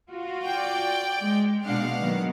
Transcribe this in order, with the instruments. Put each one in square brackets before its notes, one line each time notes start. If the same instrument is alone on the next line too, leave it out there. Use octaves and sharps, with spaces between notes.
[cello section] F4 F#4
[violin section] D5 G5
[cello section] G#3
[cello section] B2 G#3 D4 [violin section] F5 F#5
[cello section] B2 D#3 F#3